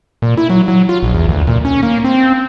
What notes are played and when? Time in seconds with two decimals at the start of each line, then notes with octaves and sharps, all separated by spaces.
0.22 A#2
0.37 E4
0.50 F#3
0.68 F#3
0.89 F4
1.03 A#1
1.15 E2
1.29 D2
1.47 A#2
1.65 C#4
1.83 A#3
2.04 C4